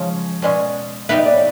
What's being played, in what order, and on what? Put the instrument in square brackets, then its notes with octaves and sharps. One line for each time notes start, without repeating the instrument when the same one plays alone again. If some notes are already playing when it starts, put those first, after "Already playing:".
Already playing: [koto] C#3 F3 G#3 C#4 [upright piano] C#5
[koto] B2 G#3 C#4 [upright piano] D5
[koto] G3 B3 D#4 G4 B4 [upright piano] E5
[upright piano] D#5
D5
C#5